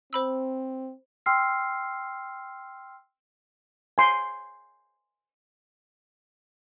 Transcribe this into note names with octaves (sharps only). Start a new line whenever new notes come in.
C4 C5 B5 E6
G5 C6 E6 F6 C7
G#5 C6